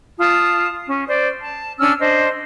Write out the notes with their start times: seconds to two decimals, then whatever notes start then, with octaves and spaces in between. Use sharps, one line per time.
0.18 F4 A5 D#6
0.86 C#4
1.07 C5 D5
1.40 A5
1.79 C#4 D4 E6 F6
2.00 D4 C5 D#5